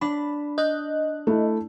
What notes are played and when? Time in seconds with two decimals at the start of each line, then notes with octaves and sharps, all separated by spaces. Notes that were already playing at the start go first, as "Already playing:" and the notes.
0.01 D4 B5
0.58 D#5 F#6 G6
1.27 A3 E4